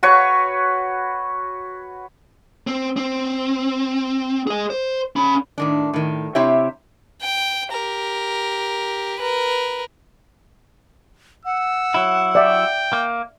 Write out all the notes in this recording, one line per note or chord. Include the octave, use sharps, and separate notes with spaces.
F#4 B4 C#5 C#6
C4
C4
G#4 D#5
C5
C#4 B5
A2 D#3 D4
A2 D#3
C3 C4 E4 G4 C#5 E5
G5
G4 A#4
A#4 B4
F#5 E6
F#3 E4
D5 E5 G5
A#3